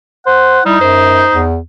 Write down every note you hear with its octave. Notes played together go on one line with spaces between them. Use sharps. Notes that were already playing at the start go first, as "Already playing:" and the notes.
C5 F#5
G3 D#4 E4
F#2 C5
E2